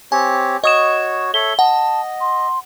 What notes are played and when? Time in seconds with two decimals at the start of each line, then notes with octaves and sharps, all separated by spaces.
0.12 C4 G4 C#5 G#5
0.64 F#4 C#5 D#5 D#6 E7
1.34 A4 C#5 E5 G7
1.59 D#5 F#5 A5
2.21 C6